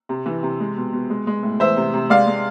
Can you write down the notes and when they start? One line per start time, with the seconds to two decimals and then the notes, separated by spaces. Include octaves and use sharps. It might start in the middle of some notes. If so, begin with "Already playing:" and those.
0.09 C3
0.26 E3
0.43 C3
0.60 G#3
0.76 B2
0.93 B2
1.10 G#3
1.27 G#3
1.43 A2
1.60 E2 C5 E5
1.77 C3
1.94 C3
2.10 G#3 D5 F5
2.27 G#3